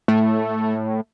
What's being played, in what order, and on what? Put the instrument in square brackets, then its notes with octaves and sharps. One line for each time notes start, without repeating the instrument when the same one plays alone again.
[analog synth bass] A2 [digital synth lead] A3